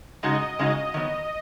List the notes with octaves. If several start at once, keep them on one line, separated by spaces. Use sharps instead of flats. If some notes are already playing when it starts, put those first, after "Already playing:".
C#3 G#3 D#4 F#4 D#5
C#3 G#3 D#4 F#4 D#5
D#3 F#3 B3